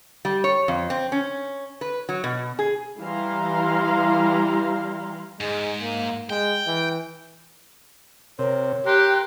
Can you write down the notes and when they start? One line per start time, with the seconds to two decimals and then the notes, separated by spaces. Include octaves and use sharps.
0.25 G3
0.44 C#5
0.68 F2
0.90 C4
1.12 C#4
1.81 B4
2.09 F#3
2.24 B2
2.59 G#4
2.98 E3 G3 E4 F5 A#5 C6
5.41 G#2 G#3
5.82 A#3
6.30 G#3 G5
6.67 E3
8.39 C3 A#4 C#5
8.86 G4 A#4 C6 F#6